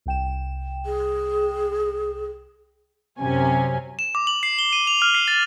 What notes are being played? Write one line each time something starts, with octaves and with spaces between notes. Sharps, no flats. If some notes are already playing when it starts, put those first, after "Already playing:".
C2 G5 E7
G#4
F#2 C3 C#4 G#5
E7
D6
F#7
C7
G7
D#7
F7
F6
C7
A6